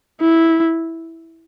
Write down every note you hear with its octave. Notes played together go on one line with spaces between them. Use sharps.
E4